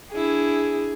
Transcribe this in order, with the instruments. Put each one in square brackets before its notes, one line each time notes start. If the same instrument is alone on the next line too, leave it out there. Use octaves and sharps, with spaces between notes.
[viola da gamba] D4 E4 [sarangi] G#4